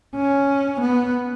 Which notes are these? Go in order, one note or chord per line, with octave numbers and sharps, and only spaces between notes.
C#4
B3